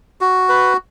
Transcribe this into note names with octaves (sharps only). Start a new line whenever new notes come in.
F#4
B4